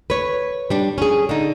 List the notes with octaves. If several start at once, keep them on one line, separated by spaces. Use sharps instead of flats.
B4 C#5
G3 D4
C#4 G#4
D3 D#4